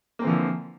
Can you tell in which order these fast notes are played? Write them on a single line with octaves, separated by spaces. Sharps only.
A#3 C4 E3 F3 D3